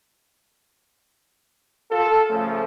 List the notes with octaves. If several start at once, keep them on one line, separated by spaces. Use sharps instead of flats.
F4 A4
C#3 F3 A3